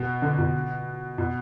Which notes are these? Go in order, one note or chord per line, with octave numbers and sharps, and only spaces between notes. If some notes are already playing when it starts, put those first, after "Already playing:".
Already playing: B2
D3
B2
B2